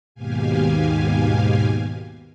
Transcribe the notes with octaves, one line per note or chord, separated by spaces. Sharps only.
D#2 G#2 B2 G4 F5 G#5